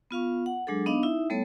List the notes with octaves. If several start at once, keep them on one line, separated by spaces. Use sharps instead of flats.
B3 F4 F5 C#6
F#5
F#3 G#3 D4 G#4 A4
B3 D4 D#4 D#5 F5
D#4 E4 E5
G3 A3 B3 A4 C#5